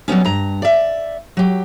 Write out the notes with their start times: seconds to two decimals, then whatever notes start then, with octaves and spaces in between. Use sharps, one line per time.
0.08 F#3 G3 B3 C#4
0.25 G2 A#5
0.62 D5 E5
1.37 F#3 G4